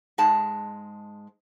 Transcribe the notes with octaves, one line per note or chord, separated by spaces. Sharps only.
G#2 G#3 A5